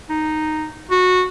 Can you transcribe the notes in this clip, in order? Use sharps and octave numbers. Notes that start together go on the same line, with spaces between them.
D#4
F#4